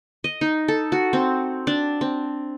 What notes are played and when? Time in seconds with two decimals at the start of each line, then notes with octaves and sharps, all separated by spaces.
0.24 D#5
0.41 D#4
0.68 A4
0.92 F#4
1.13 C4
1.67 D4
2.01 C4